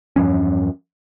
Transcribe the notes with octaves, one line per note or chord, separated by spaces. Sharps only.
E2 G2 F3 C#4